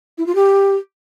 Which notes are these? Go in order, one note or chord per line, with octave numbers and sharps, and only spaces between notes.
E4
F4
G4